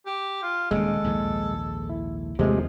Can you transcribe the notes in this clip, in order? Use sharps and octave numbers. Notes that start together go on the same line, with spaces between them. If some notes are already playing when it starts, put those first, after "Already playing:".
G4
F4
D#1 D#2 C#3 G#3 A4
A#1 D#2 G#2
E4
D#2 C3 F3 G#3 A3